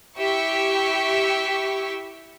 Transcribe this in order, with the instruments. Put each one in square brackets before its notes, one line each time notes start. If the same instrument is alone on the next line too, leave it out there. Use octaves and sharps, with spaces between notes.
[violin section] E4 G4 E5 C#6